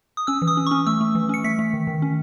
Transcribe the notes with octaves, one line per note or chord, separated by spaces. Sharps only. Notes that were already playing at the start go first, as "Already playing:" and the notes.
D#6
C#4 E6
E3
D#6
C#4
C#6
C#4
A3 E6
A3
E3
C#4 C#7
A3 B6
A3
D#3
D#3
C#4